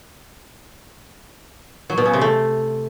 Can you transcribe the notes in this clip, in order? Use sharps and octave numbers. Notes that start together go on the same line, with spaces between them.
F#3
B2
C#3
C3
A3